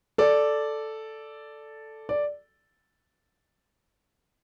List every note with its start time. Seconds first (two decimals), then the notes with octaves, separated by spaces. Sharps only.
0.18 A4 D5
2.09 D5